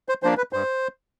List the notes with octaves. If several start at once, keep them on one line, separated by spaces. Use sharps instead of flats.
C5
F3 A#3 D4 C5
B4
G2 C5